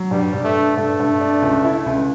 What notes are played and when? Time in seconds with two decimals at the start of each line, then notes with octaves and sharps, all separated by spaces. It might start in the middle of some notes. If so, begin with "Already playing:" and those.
Already playing: F#3
0.11 G2 G3
0.33 G2
0.45 A3
0.55 D4
0.77 G2 A3
0.99 G2
1.21 D4
1.42 C#2
1.65 E4
1.86 C#2